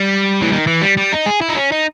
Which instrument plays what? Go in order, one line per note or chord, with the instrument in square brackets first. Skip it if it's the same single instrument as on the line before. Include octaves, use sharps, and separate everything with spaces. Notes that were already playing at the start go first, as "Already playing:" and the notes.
Already playing: [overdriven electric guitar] G3
E3
D#3
E3
G3
G3
D#4
G#4
E4
D#4
C#4
D#4